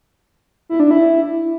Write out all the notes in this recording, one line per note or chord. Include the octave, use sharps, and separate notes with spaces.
E4
D4
E4